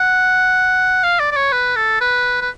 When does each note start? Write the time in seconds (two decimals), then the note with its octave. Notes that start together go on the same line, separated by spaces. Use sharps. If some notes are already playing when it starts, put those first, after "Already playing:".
Already playing: F#5
1.03 F5
1.20 D5
1.32 D5
1.36 C#5
1.52 B4
1.76 A4
2.01 B4
2.41 B4